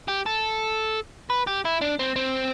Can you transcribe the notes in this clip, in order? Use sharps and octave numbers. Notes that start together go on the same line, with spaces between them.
G4
A4
B4
G4
E4
D4
C4
C4